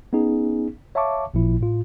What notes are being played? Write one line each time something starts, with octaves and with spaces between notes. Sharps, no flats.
B3 C#4 D#4 G#4
C#5 E5 F5 A5 C#6 D6
A1 A#2 F3 E4
A2 F4